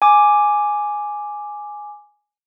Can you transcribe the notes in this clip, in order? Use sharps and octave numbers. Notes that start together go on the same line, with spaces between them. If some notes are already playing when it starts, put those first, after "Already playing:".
G#5 D6